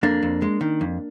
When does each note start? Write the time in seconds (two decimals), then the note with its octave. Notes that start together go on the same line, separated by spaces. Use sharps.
0.03 F2 A#3 D4
0.23 F2
0.42 G#3
0.61 D#3
0.81 F2